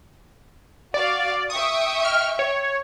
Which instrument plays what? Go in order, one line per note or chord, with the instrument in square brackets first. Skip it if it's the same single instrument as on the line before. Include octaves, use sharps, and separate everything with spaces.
[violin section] F#4 F5 [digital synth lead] D5
[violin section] E5 G5 C#6 [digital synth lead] D#6
[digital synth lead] F6
C#5